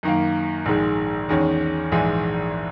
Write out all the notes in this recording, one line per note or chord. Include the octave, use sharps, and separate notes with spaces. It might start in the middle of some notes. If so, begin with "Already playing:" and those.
F#2 D#3 A#3
A#1 G#2 D#3 G#3
E2 D#3 G#3 C#4
A#1 G#2 E3 G#3